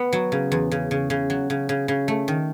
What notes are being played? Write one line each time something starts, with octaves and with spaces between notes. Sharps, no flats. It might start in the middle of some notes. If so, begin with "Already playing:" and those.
Already playing: B3
F#3
C#3
E2
C#3
C#3
C#3
F#3
C#3
C#3
C#3
A3
D#3